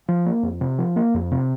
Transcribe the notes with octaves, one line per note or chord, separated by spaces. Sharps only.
F3
A#3
F2
C3
F3
A#3
F2
C3